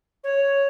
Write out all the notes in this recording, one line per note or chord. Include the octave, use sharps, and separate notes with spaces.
C#5